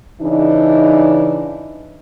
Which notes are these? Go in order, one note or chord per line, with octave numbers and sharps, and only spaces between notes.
C#3 E3 D4 D#4